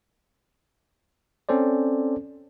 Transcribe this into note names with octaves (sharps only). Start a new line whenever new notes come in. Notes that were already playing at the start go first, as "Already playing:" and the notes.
C4 C#4 A4 C5 D5